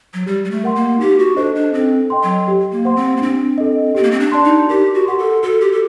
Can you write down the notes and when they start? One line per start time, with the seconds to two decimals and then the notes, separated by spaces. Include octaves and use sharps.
0.14 F#3
0.26 G3 G4
0.45 G3
0.51 A3
0.64 A#4 F#5 C6
0.75 A#3
1.00 D#4 G4
1.19 F#4
1.36 D4 A4 C5 D#5
1.55 D4
1.73 C4 A4
2.10 D#5 G5 C6
2.23 F#3
2.48 G4
2.72 A#3
2.85 C5 F#5 C6
2.96 C4
3.17 A#3
3.21 C4 D4
3.58 A4 D#5
3.95 C4 G4
4.03 A#3
4.11 C4
4.20 D4
4.32 D5 A5 C6
4.44 D#4
4.69 G4 A#4
4.94 F#4
5.06 G4 F#5 C6
5.18 A4
5.43 F#4 A4
5.61 G4
5.72 A4